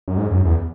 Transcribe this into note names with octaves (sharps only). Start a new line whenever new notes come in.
F#2
G#2
F#2
E2